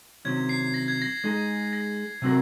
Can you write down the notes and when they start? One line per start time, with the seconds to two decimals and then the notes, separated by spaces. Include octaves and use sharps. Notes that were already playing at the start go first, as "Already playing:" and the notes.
0.25 C3 D#3 F#3 C#4 G#6
0.49 C7
0.74 A#6
0.88 G#6
1.02 A#6
1.24 G#3 D#4 G#4
1.73 A#6
2.22 C3 F#3 C4 F#4 A#4